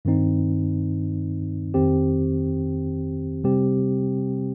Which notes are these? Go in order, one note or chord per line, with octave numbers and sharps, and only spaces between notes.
G2 D#3 C4 D#4
F2 D#3 C4 G4
C3 G3 C4 G4